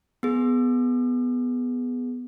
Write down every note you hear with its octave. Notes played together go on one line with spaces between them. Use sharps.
B3 G#4